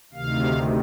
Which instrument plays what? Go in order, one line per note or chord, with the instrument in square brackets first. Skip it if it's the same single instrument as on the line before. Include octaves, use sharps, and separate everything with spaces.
[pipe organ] D2 C3 D#3 F5